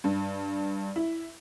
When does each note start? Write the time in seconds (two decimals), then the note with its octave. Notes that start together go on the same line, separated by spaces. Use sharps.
0.04 G2
0.96 E4